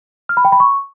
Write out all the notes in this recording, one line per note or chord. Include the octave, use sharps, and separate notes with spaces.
F6
B5
G5
B5
C#6